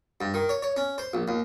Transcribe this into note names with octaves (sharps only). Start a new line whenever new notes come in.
G2
D#3
C#5
C#5
C#4
C5
A#1
D#2